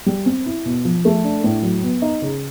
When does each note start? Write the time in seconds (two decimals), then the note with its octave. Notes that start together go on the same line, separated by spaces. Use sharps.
0.06 G3
0.26 C4
0.46 E4
0.65 B2
0.85 F3
1.05 A3
1.24 D4
1.44 A2
1.62 F#3
1.83 B3
2.02 D#4
2.22 C#3